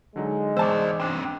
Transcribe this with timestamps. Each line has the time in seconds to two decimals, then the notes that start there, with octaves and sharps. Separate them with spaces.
0.16 D3 F#3 G#3 D#4
0.57 E2 G#2 C5 D5 A5 E6
1.00 C4 D4